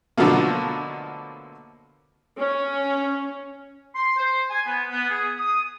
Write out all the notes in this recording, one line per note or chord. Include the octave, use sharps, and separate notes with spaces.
B2 D3 F3 F#3 A3 A#3
C#4
C6
C5
G#5
B3
B3
G#4
D#6